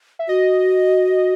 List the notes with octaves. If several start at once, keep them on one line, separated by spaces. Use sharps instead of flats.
E5
F#4 D#5